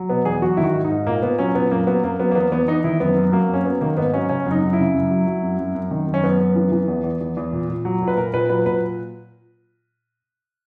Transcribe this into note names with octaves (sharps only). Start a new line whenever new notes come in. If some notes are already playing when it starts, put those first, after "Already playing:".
Already playing: F#3
B2 B3
E2 G#4
F#3 F#4
D#3 E4
F#4
G#2
D#4
G#2
A#2 A#3
A#2 B3
F#3 C#4
A#2 B3
F#2 A#3
F#3 B3
F#2 A#3
F#3 B3
A#3
E2 B3
E2 B3
E2 D#4
D#3 E4
F#2 B3
F#2
F#3 A#3
F#2 C#4
F#3 B3
D#3 A#3
G#2 B3
F#3 C#4
C#3 C#4
F#2
D#4
F#2
E4
C#3
F#2
F#3
F#3
F#2
F#2
F#2
D#3
F#2
C#4
F#2 B3
F#2
E3
E3
E2
E2
E2
E2
A#2
A#2
F#3
A#2
B4
A#2 A#4
A#2 B4
F#3 B4
A#2 B4